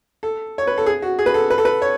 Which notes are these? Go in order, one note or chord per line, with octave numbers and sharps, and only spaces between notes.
A4
C#5
B4
A4
G#4
F#4
G#4
B4
A4
B4
A4
B4
C#5